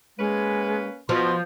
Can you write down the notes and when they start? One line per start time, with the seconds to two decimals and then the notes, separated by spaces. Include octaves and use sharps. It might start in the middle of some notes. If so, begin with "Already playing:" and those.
0.18 G#3 A#3 C#4 B4
1.09 B2 F3 C6